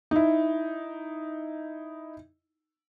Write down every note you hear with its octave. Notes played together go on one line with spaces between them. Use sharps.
D#4 E4